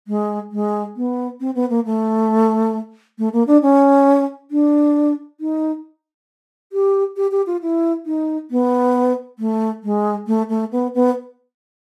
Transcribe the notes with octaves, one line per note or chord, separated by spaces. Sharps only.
G#3
G#3
B3
C4
B3
A#3
A3
A3
A#3
D4
C#4
D4
D#4
G4
G4
G4
F4
E4
D#4
B3
A3
G#3
A3
A3
B3
B3